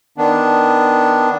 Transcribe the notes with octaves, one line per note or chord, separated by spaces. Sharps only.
D#3 B3 D4